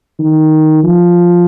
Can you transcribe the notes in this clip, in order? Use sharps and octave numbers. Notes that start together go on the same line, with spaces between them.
D#3
F3